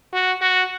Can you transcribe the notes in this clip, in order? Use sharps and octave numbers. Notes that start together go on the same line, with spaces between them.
F#4
F#4